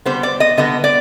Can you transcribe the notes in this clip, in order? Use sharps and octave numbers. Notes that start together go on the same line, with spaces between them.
D3 G3 B3 C5
D5
D#5
D3 G3 B3 D#5
D5